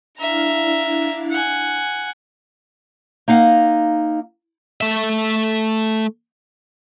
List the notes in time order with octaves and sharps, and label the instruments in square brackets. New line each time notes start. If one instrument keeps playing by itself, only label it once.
[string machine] D4 E4 F5 [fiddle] E5 A#5
[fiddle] F#5 G#5
[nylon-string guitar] A#3 D#4 F5 F#5
[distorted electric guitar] A3 E5